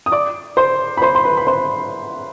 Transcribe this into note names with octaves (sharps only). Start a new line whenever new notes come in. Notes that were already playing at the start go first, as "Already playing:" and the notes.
D#6
D5 D6
C5 C6
B5
C5 C6
C6
B4 B5
B5
C5 C6